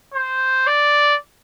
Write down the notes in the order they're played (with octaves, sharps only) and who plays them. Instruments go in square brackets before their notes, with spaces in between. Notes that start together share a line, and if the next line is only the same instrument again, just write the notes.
[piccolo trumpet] C5
D5